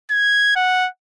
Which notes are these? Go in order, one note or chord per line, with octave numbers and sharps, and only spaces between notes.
G#6
F#5